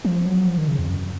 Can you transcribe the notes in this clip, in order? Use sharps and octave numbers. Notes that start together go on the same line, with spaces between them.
F3
F#3
F3
D#3
C#3
F2
F#2